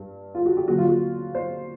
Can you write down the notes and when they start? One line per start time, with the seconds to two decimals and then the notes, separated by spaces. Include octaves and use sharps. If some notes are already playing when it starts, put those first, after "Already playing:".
Already playing: G2
0.35 F4
0.45 F#4
0.57 G4
0.68 D#2 D3 F#3 F#4
0.78 F4
0.89 F#4
1.35 C5